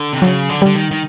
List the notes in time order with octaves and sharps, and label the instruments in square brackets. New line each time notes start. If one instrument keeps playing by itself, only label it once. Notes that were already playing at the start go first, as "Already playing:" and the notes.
Already playing: [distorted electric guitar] D3
C3
[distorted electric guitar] C#3 [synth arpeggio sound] F#3
[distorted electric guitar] D3
[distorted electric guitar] D3 [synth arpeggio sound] G3
[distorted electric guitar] D#3
D#3